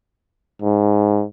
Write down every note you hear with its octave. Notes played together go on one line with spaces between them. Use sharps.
G#2